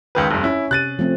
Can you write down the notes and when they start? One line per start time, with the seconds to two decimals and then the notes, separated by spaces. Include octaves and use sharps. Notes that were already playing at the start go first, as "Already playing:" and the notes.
0.15 C#2 D#3 B4
0.31 F1 G2
0.44 C#4 E4
0.71 C3 F#6 A6 D#7
0.99 F3 A3 C4